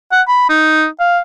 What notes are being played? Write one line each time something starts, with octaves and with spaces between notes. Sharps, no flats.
F#5
B5
D#4
F5